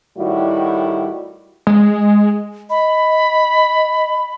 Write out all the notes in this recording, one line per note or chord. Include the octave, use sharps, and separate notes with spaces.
A2 D#3 G3 E4 F#4
G#3
D#5 B5